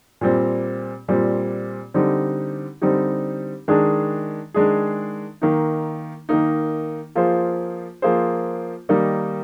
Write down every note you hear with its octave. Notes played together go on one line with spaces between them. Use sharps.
A#2 G3 C4
A#2 G3 C4
D3 G3 C4 D#4 G4
D3 G3 C4 D#4 G4
D#3 G#3 D4 G#4
D#3 G#3 D4 G#4
D#3 A#3 D#4
D#3 A#3 D#4
F3 A#3 F4 G#4 C5
F3 A#3 F4 G#4 C5
D#3 G3 A#3 D#4